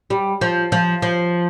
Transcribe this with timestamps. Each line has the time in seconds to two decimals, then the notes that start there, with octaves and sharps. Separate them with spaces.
0.10 G3
0.41 F3
0.72 F3
1.02 F3